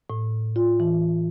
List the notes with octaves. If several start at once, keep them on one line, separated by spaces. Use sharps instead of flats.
A2
F4
E3